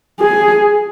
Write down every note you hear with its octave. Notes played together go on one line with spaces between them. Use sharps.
G#4